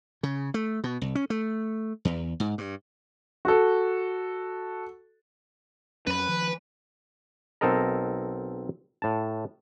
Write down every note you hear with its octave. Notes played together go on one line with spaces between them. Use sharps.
C#3
A3
B2
C2
C#4
A3
E2
G#2
G2
F#4 A4
F2 F#3 C#4 B4 B5
D#3 F3
B1 C4 A4 A#4 D#5 A#5
A2 A5